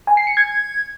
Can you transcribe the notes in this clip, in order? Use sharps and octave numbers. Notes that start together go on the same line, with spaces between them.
G#5
C7
C#7
G#6